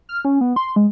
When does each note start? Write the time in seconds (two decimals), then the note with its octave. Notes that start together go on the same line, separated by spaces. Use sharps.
0.09 F6
0.25 C#4
0.41 B3
0.56 C6
0.76 G#3